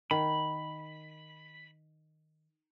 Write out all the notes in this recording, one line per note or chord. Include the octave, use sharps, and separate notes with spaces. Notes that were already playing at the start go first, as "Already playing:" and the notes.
D#3 B5